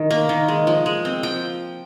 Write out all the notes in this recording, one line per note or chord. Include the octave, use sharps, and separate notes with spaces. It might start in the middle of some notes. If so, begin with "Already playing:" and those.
Already playing: D#3
A#3
D#3
G#3
F3
G#3
C4
F3 G5